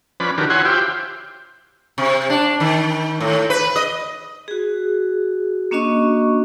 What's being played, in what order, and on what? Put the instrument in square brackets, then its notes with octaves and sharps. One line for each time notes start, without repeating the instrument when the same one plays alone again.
[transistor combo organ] F3 C#4 B4 D5 B5
D#3 D4 F#4 G4 A#4 B4
E4 F#4 C#5 F#5 G#5 C6
F4 G4 C5 E5 G5
[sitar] C3
D4
D#3
A2
B4
D#5
[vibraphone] F#4 G#4
A#3 C#4 D4 F#4 D#5 C#6